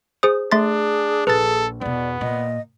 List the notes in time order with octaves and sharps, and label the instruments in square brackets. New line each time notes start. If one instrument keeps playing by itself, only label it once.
[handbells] G#4 C5 D#6
[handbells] A3 C6 A6 [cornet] D4 [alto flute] G#4
[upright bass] A#1 [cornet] A4 [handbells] B4 A6
[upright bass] E2 B2 [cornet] B3 [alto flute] D5
[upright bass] A#2 [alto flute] D#5